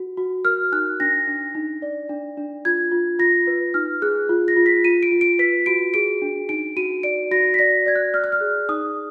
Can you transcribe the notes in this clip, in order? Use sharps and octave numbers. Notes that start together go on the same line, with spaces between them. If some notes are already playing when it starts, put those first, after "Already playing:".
Already playing: F#4
F#4
A#4 F6
D#4 F#6
D4 A#6
D4
D#4
D5
D4
D4
F4 G#6
F4
F4 A#6
B4
D#4 F6
G#4 F#6
F4
A#6
F4
B6
F4 D#7
D7
F4
D7
B4 B6
F#4 D7
G#4 D7
D4
D#4 D7
F#4 D#7
D5 D7
F#4 A#6
B6
D5 A#6
D5 G#6
F#6
D5 F6
F#6
F6
G#4
D#4 D#6